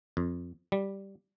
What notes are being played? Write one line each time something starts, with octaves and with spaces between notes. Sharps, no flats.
F2
G3